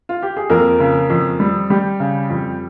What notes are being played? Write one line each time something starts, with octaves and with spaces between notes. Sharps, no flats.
F4
G4
G#4
F2 A#3 A#4
C#3
F2
G3
G3 G4
C#3
F2